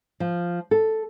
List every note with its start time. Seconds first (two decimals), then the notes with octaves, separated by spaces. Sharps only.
0.20 F3
0.71 A4